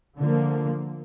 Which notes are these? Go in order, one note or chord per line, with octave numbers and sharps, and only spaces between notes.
D3 F3 A#3